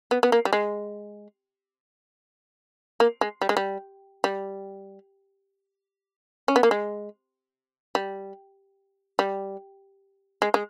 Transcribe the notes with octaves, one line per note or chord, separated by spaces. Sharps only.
B3
B3
A#3
G3
G#3
A#3
G#3
G3
G#3
G3
G3
C#4
B3
A#3
G#3
G3
G3
G#3
G#3